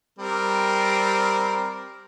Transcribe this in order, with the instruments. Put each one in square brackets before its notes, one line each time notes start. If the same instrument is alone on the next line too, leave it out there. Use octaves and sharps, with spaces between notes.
[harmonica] G3 C4 A#4